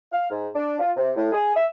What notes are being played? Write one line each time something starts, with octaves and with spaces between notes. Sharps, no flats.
F5
G#2
D4
F4
C3
A2
G#4
E5